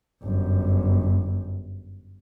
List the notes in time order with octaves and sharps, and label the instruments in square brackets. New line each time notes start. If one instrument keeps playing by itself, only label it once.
[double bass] G1 F#2